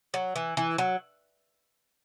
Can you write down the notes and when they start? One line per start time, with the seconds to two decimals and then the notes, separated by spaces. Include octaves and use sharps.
0.14 F#3
0.36 E3
0.57 E3
0.78 F#3